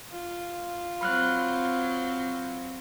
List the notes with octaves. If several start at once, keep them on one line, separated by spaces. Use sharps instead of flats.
F4
F#3 C4 B5 F6 F#6